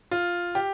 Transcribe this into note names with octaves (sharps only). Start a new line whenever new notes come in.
F4
G4